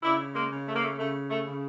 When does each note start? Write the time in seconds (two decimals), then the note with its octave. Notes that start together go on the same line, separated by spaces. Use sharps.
0.03 C#3 D4 E4
0.34 G#3 A#3
0.50 C#3
0.67 A3
0.74 A#3
0.83 A3
0.98 C#3 A3
1.29 A3
1.44 C#3